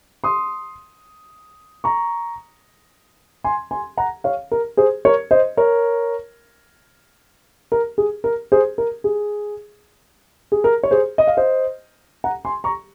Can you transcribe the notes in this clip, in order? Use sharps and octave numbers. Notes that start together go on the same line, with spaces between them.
C6 D#6
A#5 C#6
G#5 C6
G#5 C6
F#5 A#5
C#5 F5
A#4
G#4 C5
A#4 C#5
C5 D#5
A#4 C#5
A#4
G#4
A#4
G#4 C5
A#4
G#4
G#4
A#4
C#5
G#4 C5
D#5
F5
C5 D#5
F#5 A#5
G#5 C6
A#5 C#6